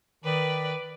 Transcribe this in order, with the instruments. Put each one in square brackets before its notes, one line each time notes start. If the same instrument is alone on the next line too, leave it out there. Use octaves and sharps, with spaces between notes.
[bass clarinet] D#3 [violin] B4 D5